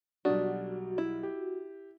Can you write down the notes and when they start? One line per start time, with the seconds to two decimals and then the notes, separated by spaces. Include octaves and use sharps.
0.25 B1 G3 D4 F#4 D#6
0.98 E4
1.23 G4